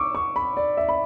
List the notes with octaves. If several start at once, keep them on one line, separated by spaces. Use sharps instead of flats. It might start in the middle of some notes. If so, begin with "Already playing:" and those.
Already playing: C#6 D6 E6
C#6
B5
D5
E5
B5